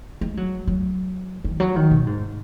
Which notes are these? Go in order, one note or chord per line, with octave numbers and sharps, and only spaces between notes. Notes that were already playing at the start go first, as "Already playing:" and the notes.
G#3
F#3
F#3
D#3
F#3
D#3
B2
G#2